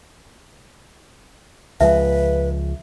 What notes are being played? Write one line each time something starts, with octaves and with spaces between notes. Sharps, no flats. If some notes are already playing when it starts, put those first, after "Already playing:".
C#2 F3 G#3 B4 E5